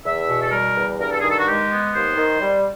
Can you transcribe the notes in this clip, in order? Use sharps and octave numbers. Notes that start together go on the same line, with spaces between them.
E2 E5
B2
A4
G3 A#4
E2
G2 A#4
A4
D#3 G#4
A4
F#4
G#3 G4
B3
D#2 C5
D#3
G3